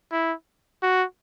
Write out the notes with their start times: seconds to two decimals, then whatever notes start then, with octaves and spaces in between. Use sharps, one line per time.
0.12 E4
0.83 F#4